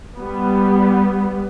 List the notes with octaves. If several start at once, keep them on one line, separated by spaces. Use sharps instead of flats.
G3 B3